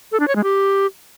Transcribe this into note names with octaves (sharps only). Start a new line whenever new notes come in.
A4
D4
C#5
G#3
G4